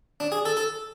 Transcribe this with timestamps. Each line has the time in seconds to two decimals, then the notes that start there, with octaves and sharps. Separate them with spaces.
0.20 D4
0.32 G#4
0.45 A4
0.57 A4